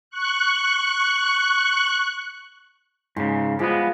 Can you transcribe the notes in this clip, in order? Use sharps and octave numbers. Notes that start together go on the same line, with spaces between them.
C#6 F#6
G#2 C#3 C6
F3 G3 G#3 B3 G#4